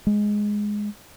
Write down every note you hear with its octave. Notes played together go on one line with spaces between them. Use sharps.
G#3